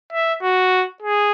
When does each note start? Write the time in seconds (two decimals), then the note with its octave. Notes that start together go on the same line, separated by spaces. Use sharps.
0.13 E5
0.43 F#4
1.03 G#4